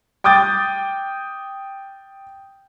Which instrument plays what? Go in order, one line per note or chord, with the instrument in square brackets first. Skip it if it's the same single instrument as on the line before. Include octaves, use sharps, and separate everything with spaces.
[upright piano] G5 D6 D#6 G6 A6